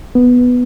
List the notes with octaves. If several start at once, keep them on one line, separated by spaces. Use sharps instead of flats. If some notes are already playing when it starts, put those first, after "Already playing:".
B3